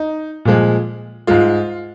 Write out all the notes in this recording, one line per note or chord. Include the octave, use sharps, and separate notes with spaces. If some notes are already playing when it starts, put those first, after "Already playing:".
Already playing: D#4
A#2 F3 G#3
G#2 G#3 F4